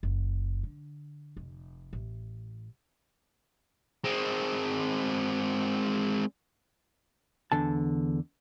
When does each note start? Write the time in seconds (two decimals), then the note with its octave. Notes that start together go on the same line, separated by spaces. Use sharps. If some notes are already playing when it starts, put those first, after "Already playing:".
0.03 F#1
0.63 D3
1.37 F1
1.93 A1
4.04 G#3 C4
7.52 E2 D3 A5